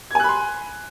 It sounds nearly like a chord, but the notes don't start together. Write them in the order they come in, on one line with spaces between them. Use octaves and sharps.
G#6 G#5 F#6 B5 C6